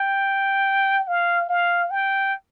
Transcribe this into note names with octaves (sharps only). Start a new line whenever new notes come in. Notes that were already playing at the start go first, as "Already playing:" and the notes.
Already playing: G5
F5
F5
G5